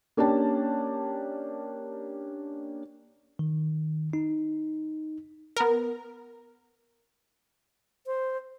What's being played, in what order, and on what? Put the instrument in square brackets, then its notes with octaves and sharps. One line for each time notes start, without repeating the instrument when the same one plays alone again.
[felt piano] A#3 C#4 D4 G4 A5
[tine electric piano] D#3
D#4
[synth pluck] B3 A#4
[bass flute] C5